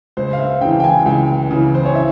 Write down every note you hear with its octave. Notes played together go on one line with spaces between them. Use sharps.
C#2 C5
F5
E5
C#3 E3 G5
G5
G#5
C#2 G5
C#3 E3
C5
C#5
E5